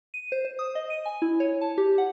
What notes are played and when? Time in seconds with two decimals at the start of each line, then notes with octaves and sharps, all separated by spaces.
0.14 D#7
0.32 C5
0.45 C5
0.59 D#6
0.75 D#5
0.90 D#7
1.05 G#5
1.22 E4
1.40 C#5
1.61 A5
1.78 G4
1.98 F#5